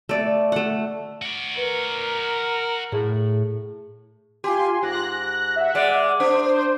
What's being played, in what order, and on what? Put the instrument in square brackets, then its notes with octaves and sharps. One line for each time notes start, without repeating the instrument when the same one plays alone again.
[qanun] A3 D5
A3 F#5
[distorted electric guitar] F#4 D5
[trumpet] A#4 [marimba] B4
[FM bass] A2 [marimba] G#4
[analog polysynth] F4 G#5 C6 [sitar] G4
[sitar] G#2 [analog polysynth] F#6 A#6
[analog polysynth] E5 F#5
[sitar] G#3 D5
[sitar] D4 [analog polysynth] C5
[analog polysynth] C5